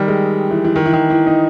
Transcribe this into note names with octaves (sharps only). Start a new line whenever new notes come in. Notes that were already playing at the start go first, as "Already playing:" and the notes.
Already playing: D#3 G3
G#3
E3
E3
D#3
E3
D#3
E3
D#4